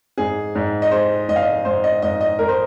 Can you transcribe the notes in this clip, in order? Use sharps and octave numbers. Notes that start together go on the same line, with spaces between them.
G#2 G#4
G#2
D#5
G#3 C5
G#2 D#5
F5
D#5
G#2 C5
D#5
G#2 D#5
D#5
G#2 A#4
C5